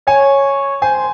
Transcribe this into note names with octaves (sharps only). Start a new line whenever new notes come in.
C#5 G#5
C5 G#5